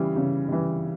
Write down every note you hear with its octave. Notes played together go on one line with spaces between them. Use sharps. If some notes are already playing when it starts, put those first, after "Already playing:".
Already playing: C#3 E3 G3
C#3
E3 G3